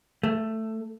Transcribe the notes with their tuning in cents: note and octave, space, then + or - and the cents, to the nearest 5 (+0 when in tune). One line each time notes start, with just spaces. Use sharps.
A3 +10